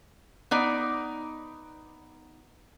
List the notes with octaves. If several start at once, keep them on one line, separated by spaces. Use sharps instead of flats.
B3 D#4 D5